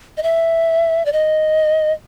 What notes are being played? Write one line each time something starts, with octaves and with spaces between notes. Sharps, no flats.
D#5
E5
D5
D#5